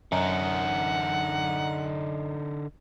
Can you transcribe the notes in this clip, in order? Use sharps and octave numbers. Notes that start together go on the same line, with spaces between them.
F#2 D3 D#4 F#5